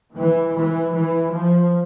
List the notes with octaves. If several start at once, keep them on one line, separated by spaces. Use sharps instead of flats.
E3
E3
E3
F3